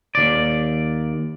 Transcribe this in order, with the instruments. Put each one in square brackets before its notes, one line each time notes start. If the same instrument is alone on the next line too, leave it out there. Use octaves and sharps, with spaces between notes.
[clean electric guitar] D#2 D5